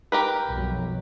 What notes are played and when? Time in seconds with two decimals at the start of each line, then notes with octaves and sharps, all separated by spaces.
0.12 G4 A#4 B4
0.48 B1 F2 F#3